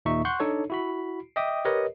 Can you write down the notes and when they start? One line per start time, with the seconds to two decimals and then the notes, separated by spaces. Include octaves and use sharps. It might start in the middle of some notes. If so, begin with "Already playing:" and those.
0.05 D#2 A#2 D#4 E5 C#6
0.25 F#5 C6 C#6 F#6 G6
0.40 D4 D#4 A4 C#5
0.70 E4 F#4 B5
1.36 D#5 E5 G5 D6 D#6
1.65 G4 A#4 B4 C#5 D#5